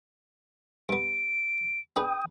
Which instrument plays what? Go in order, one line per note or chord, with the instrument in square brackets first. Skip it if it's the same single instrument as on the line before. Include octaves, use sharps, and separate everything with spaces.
[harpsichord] G2 B3 [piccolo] D7
[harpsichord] D4 G#4 B4 [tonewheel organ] G5 D#6